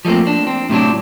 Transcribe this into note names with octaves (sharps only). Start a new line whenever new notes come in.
F3 G3 A3 A#3 C4
D4
C4
A2 C3 F#3 D4